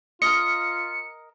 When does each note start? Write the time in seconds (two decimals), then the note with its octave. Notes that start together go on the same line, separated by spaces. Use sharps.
0.22 F4 A#4 D#5 C#7